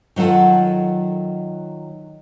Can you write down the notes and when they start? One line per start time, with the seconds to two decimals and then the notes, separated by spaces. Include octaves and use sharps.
0.16 D#3 F#3 F4 A4 F#5